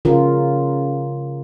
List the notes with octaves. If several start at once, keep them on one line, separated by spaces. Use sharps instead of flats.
C#3 F4 A#4